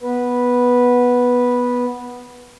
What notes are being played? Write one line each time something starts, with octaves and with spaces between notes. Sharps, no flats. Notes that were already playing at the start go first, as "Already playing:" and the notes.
B3 B4